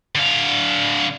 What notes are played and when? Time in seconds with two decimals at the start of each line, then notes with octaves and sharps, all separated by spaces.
0.15 D3 F5